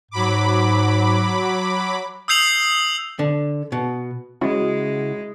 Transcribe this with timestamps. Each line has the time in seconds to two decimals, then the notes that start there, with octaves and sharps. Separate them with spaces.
0.11 G#2 F#3 B5 D6
2.28 D#6 E6 G6 C7 F7 F#7
3.19 D3
3.72 B2
4.41 C#3 G#3 E4 F#4